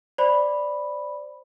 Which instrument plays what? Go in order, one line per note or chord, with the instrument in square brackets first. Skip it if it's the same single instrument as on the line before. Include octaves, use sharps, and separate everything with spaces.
[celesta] C5 D5 B5